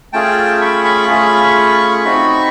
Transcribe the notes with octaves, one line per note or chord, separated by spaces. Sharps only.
A3 C#4 F4 G#4 G5 A5
B5 C#6
B5 C#6
A3 C#4 F4 G#4
C4 D#4 F#4 B5 C#6